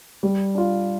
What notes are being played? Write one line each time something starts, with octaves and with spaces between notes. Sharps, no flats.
G3
D4 F4